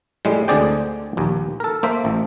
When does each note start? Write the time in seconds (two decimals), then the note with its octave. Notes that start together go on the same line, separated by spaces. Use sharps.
0.25 A2 G3 G#3
0.48 D2 D3 C4 G#4 D5 G5
1.17 A#1 D#2
1.60 A4 A#4
1.83 A#3 C5 E5
2.05 A1